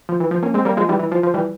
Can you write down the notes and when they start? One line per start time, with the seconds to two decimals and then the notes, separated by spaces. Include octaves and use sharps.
0.09 F3
0.20 E3
0.31 F3
0.43 A#3 C#4
0.54 G#3 C4
0.65 G3 A#3
0.77 F3 G#3
0.89 E3 G3
0.99 E3
1.12 F3
1.23 F3
1.34 E3 G3